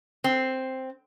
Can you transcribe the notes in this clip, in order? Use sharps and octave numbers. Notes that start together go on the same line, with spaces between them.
C4